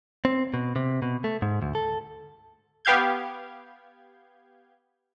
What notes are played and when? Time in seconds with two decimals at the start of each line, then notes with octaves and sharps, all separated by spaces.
0.25 C4
0.54 B2
0.76 C3
1.02 B2
1.24 A3
1.42 G#2
1.62 D2
1.75 A4
2.85 B3 G4 F5 G6 G#6